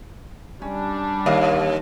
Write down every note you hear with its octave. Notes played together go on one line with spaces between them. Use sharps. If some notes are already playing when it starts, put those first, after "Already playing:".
G3 C#4 D4
D#2 A#4 D#5 F5